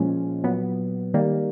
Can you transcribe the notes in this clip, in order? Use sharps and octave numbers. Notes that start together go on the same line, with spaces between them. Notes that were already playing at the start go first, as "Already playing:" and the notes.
Already playing: A#2 F3 G#3 C#4
A#2 F#3 B3
D#3 G3 A#3